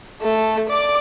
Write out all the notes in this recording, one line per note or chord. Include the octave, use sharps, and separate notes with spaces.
A3 A4
D5 D6